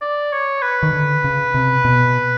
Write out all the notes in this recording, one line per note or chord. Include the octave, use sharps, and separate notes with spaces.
D5
C#5
B4
D#3
D3
C#3
C3
B2